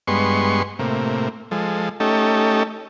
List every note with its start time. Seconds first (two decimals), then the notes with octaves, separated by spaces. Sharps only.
0.07 G2 G#3 B3 C6 C#6
0.79 A2 C3 A#3
1.51 F3 G#3 A4
2.00 A3 C#4 D#4 G4 A4